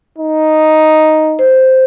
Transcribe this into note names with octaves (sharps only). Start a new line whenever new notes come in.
D#4
C5